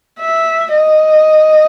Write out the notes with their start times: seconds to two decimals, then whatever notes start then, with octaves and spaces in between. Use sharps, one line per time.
0.20 E5
0.74 D#5